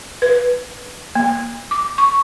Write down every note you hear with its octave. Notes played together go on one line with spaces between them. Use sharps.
B4
A#3
D6
C#6